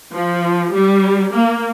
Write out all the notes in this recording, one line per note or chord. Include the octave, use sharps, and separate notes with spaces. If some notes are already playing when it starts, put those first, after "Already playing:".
F3
G3
A#3